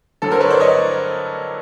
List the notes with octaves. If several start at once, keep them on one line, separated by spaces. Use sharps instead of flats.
G2 D3 F#3 A4
A#4 C5
B4 C#5
C5 D5
C#5 D#5